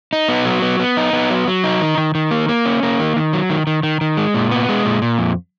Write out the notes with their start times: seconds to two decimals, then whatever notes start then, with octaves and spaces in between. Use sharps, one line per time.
0.13 D#4
0.29 B3
0.45 F#3
0.62 B3
0.80 B3
0.97 D#4
1.13 B3
1.30 F#3
1.48 F#3
1.64 D#4
1.81 D#3
1.98 D#3
2.15 D#3
2.31 A#3
2.49 A#3
2.66 C#4
2.83 A#3
3.00 D#3
3.16 D#3
3.33 F#3
3.50 D#3
3.67 D#3
3.83 D#3
4.01 D#3
4.17 G#3
4.34 A#2
4.51 B3
4.69 G#3
4.85 A#2
5.02 A#2
5.19 F2